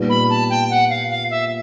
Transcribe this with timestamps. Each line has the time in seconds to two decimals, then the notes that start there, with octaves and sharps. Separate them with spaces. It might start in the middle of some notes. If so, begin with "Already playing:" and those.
Already playing: A#2 G3 B3 D#4
0.09 B5
0.30 A5
0.50 G5
0.70 F#5
0.90 F5
1.10 F5
1.31 E5